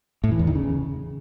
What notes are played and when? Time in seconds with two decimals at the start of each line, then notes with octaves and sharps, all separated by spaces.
0.24 A2
0.31 E3
0.39 E2
0.47 D#3
0.55 C#3